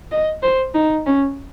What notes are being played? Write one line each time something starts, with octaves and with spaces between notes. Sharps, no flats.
D#5
C5
D#4
C#4